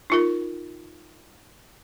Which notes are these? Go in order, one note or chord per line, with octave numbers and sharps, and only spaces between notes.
D#4 F4 A#4